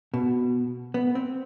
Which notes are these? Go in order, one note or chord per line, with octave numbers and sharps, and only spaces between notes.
B2
B3
C4